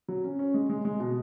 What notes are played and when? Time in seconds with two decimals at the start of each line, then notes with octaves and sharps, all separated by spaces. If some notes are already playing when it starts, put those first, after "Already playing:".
0.08 F#3
0.24 C#4
0.39 C#4
0.54 G#3
0.69 G#3
0.85 G#3
1.00 B2